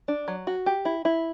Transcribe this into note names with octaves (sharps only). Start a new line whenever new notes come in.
D4
F#3
F#4
G4
E4
E4